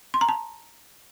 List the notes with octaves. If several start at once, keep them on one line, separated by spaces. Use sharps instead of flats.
C6
A#5
A5